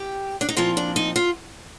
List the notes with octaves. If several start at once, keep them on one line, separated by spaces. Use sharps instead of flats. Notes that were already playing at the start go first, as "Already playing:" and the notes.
Already playing: G4
D4
D#4
A#2 F3 C4 F4
D4
D#4
F4